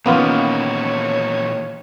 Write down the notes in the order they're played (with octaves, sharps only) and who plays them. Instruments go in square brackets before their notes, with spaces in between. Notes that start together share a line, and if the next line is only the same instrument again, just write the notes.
[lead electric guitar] A#2 E3 [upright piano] D#3 C#4 [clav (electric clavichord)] A#3 B3 F4 [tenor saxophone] C#5